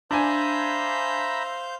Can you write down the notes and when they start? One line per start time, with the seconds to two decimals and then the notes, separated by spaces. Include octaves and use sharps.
0.11 D4 C5 E5 F5 G#5 A#5 B5 G6